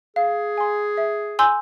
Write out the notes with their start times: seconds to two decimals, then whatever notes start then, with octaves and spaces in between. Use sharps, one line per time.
0.16 G#4 F5
0.58 G#5 C6
0.97 E5
1.39 G#5 C6 E6 G6